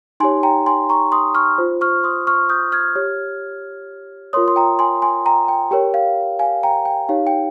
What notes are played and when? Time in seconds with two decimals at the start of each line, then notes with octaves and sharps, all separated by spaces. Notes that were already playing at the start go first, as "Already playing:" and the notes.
0.20 D#4 G4 C#5 G#5 C6
0.43 G5 A#5
0.66 G#5 C6
0.90 A#5 C#6
1.12 C6 D#6
1.35 C#6 F6
1.58 F4 C5
1.81 C#6 F6
2.03 C6 D#6
2.27 C#6 F6
2.49 D#6 G6
2.72 F6 G#6
2.96 G4 C#5
4.33 F4 A#4 C#5 C6 D#6
4.48 C6
4.56 G5 A#5
4.79 G#5 C6
5.02 G#5 C6
5.26 G5 A#5
5.48 G5
5.71 G4 A#4 C#5 G5
5.94 F5
6.39 F5 G#5
6.63 G5 A#5
6.85 G5
7.09 D#4 G4 C#5 F5
7.27 G5